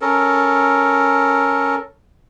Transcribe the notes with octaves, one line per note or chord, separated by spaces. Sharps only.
C#4 A4 A#4